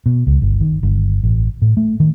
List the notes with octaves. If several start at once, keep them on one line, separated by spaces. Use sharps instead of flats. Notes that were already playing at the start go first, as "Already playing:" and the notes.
B2
C#2
G1
D#3
G1
A1
A2
A3
D#3